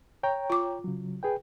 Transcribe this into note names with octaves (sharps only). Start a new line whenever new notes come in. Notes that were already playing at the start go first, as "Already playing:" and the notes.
C#5 G5 A#5
F4 D6
C#3 F#3
G#4 B4 G5